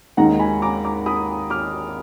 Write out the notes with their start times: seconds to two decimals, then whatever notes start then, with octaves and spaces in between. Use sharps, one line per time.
0.17 D#2 D#3 G#3 D#4 F#5 A#5
0.39 G#5 B5
0.62 A#5 D6
0.85 A#5 D6
1.06 B5 D#6
1.50 D6 F6